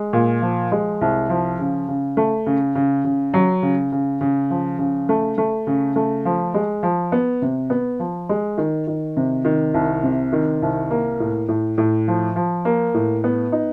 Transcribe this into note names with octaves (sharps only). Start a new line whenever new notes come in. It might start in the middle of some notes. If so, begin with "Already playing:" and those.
Already playing: G#3
A#2
F3
G#3
C2
F3
C#3
C#3
A3
C#3
C#3
C#3
F#3
C#3
C#3
C#3
F3
C#3
A3
A3
C#3
A3
F3
G#3
F3
B3
C3
B3
F3
G#3
D#3
D#3
C3
D#3
C2
C3
D#3
C2
A#3
A2
A2
A2
F3
F3
A#3
A2
B3
D#4